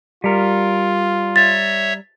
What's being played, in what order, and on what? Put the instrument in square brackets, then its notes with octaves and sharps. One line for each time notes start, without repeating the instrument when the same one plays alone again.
[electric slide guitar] G3 A#4 [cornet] F4
[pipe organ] C#5 E5 [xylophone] A6